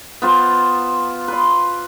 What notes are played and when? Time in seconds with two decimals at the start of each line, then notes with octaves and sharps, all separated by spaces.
0.22 B3 F4 C5
1.28 B4 C6